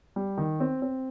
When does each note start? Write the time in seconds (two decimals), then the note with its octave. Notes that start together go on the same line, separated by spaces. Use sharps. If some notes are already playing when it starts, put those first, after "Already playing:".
0.16 G3
0.38 D#3
0.60 C4
0.82 C4